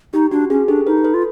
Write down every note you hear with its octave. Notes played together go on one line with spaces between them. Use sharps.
D#4 G4
D4 F#4
C#4 G#4
D4 G4 A4
D#4 A4 B4
A4 B4
F4